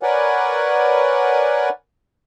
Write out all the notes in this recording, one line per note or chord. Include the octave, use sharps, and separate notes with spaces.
A#4 B4 C#5 D5 F#5 G#5